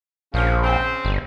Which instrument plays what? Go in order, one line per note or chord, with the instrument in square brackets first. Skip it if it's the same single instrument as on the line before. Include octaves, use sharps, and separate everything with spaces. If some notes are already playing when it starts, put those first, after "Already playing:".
[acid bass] A#1 [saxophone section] C#3 F3
[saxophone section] C#3 C4
[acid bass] G1